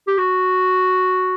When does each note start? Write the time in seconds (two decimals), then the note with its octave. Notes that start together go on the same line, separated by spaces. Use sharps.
0.07 G4
0.18 F#4